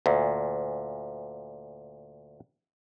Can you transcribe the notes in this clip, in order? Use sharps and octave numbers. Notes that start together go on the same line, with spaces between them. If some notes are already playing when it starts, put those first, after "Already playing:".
D2 A#2